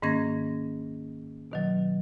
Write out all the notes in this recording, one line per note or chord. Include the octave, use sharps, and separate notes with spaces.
G#2 D#3 A#3 C#4 G#6 A#6
B2 D#3 F#3